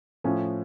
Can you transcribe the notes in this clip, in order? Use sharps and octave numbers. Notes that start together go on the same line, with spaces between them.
A2 F3 C#4